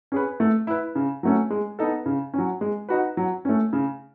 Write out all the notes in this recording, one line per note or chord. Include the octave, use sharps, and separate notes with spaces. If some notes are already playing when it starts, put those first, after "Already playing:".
C#4 G#4 B4
A3
E4 B4
C#3
F#3 A3 C#4
G#3
B3 D#4 A4
C#3
F#3 C#4
G#3
D#4 F#4 B4
F#3
A3 C#4
C#3